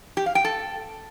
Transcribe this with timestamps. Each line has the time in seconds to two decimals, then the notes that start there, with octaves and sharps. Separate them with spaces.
0.17 G4
0.26 F5
0.35 G5
0.45 A4